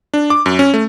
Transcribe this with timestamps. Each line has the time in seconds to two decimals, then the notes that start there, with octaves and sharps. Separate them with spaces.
0.14 D4
0.30 D6
0.46 F#2
0.59 C#4
0.74 A3